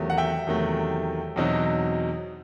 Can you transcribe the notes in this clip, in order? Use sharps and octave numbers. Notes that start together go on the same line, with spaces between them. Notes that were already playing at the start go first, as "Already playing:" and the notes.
Already playing: E2 C3 D#3 F#3 A3
F#5
E5 G5
E2 C3 D#3 F#3 A3
E2 B2 F#3 C4 D#4